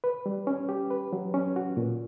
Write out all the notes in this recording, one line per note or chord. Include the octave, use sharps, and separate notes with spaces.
B4
G3
C#4
G4
B4
F#3
C#4
F#4
A#2